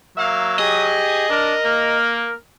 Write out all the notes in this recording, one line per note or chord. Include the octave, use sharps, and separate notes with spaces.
F#3 A#3 E5 F5
G4 G#4 D#5
D4 A#4
A#3